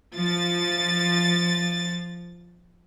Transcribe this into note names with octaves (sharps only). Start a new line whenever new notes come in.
F3 A6